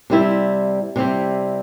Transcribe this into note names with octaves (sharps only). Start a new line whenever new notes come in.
C3 G3 C4 E4
C3 G3 C4 E4